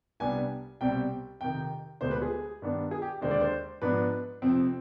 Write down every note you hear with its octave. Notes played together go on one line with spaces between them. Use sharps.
C2 C3 G3 B3 D4 G#5
C2 B2 G3 C4 G5
F2 C3 D#3 G5
D2 D3 G#3 B3 D4 C5
B4
G#4
G2 D#3 B3 D4
G#4
G4
D#2 D3 G#3 D4 C5
D5
C5
G#2 F3 B3 D4 B4
F2 C3 F3 C4